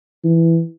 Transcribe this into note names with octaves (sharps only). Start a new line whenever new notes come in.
E3